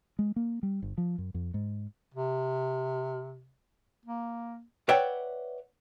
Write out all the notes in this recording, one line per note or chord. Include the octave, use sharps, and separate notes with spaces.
G#3
A#3
G3
G1
F3
F#2
F2
G#2
C3
A#3
B4 C#5 D5 E5 F#5 G5